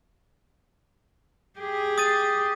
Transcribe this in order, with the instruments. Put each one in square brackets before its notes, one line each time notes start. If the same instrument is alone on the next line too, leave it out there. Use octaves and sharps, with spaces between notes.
[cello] G4 G#4
[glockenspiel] D#6 A6 D#7